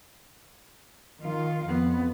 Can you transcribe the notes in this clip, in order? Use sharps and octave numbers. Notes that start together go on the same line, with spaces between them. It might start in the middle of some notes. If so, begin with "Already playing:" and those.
D#3 F4 F5
F2 B3